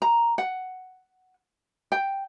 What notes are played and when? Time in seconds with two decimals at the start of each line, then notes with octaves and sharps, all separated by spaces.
0.02 A#5
0.38 F#5
1.92 G5